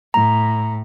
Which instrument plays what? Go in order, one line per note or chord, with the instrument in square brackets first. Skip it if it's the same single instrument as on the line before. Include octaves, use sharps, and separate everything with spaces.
[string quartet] A2 [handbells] A#5